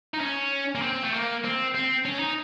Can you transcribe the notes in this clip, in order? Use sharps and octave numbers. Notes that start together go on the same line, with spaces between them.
D#4
C#4
A#3
C4
A3
A#3
C4
C4
C#4
D#4